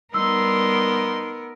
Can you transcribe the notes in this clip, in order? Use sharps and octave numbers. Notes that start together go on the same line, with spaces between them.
G3 B3 D#4 A#4 C6 E6